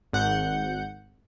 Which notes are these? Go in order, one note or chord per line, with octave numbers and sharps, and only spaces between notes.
G#1 F#5 G6